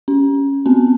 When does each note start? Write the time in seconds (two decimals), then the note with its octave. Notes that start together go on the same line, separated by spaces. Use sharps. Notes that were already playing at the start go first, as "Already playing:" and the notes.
0.08 C#4
0.66 B3 C4